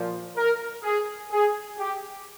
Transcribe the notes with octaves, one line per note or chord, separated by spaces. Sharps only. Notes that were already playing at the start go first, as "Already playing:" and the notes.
Already playing: A#2 F3
A#4
G#4
G#4
G4